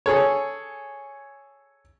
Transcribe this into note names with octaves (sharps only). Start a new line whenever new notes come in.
G#4 A4 C#5